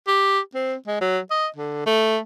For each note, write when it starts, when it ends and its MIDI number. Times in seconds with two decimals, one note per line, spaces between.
0.07 0.39 67
0.55 0.76 60
0.87 0.99 56
1.01 1.19 54
1.31 1.48 75
1.56 1.82 50
1.86 2.19 57